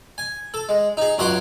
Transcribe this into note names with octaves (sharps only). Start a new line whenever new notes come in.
G#5
A4
G#3
D#4 G#4
C#2 F#2 C#5 F#5 C6 D6